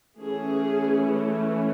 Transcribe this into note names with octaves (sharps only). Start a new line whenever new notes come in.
E3 A3 C#4 G#4